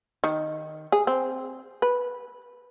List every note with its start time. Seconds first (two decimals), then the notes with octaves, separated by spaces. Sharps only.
0.24 D#3
0.92 G#4
1.07 C4
1.82 B4